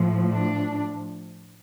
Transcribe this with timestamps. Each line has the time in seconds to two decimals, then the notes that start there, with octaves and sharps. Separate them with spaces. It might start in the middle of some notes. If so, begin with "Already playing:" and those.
Already playing: A2 F3
0.32 D4